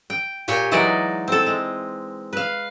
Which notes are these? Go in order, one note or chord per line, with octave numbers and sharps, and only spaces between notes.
G5
A#2 G4 C#5 G5 G#5
E3 F#3 G#3 D#4 D5 D#5
C4 A4
G#3
B4 F5